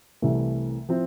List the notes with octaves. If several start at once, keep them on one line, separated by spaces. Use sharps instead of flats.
C2 C3 E3 A3 E4
F3 C4 E4